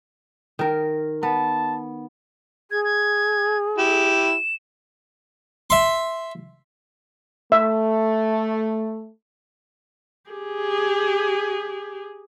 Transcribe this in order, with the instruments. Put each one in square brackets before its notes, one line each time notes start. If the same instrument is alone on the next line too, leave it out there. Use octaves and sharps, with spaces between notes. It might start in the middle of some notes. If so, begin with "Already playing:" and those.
[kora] D#3 A#4
[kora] B3 [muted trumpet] A5
[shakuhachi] G#4 [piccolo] G#6
[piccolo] G#6
[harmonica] E4 G4 [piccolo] E7
[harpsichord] E5 C6
[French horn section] A3 [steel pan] E5
[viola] G4 G#4